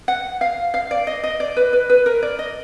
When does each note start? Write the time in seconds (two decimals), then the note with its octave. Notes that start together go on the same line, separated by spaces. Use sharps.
0.08 F#5
0.41 F5
0.74 F5
0.91 D5
1.07 D#5
1.24 D#5
1.40 D5
1.57 B4
1.73 B4
1.90 B4
2.06 A#4
2.23 D5
2.39 D#5